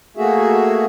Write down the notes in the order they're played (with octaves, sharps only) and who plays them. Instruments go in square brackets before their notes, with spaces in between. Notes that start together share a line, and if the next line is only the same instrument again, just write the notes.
[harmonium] A3 A#3 F#4 G#4 E5